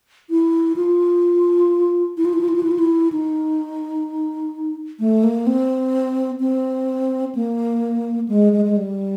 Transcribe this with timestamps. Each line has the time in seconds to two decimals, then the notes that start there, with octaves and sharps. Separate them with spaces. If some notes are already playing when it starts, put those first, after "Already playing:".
0.30 E4
0.76 F4
2.17 E4
2.25 F4
2.33 E4
2.41 F4
2.48 E4
2.56 F4
2.63 E4
2.71 F4
2.79 E4
3.12 D#4
4.99 A3
5.24 A#3
5.47 C4
6.40 C4
7.35 A#3
8.29 G#3
8.53 G#3
8.65 G#3
8.77 G3